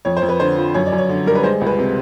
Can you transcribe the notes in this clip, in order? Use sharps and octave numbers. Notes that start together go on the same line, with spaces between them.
F2 C#5
C5
F2
B4
D3 C5
F3
F#2 C#5
D5
F#2
C#5
D3
G3 A#4
B4
G#3 C5
C#2
B4
C3